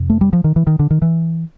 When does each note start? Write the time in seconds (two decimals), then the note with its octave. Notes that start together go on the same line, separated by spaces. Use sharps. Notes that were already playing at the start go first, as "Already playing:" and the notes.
Already playing: F2 C3
0.10 A3
0.21 G3
0.33 F3
0.44 D#3
0.56 E3
0.67 D#3
0.79 D3
0.91 D#3
1.02 E3